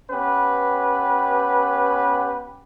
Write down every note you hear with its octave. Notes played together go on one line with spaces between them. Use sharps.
B3 C#4 G4 B4